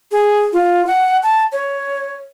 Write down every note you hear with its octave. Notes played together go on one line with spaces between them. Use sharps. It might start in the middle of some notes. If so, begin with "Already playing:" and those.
G#4
F4
F#5
A5
C#5